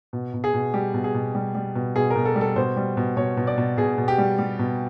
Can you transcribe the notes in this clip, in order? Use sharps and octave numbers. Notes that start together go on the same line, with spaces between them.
B2
B2
G#4
B2
G3 G4
B2
G#4
B2
G3
G3
B2
B2 G#4
A#4
B2
A4
G3
A4
B2 C5
G3
B2
B2 C#5
B2
D5
B2
B2 G#4
B2
G4
G3
G3
B2